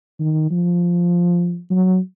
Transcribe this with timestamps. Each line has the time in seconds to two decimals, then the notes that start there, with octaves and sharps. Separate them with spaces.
0.20 D#3
0.51 F3
1.71 F#3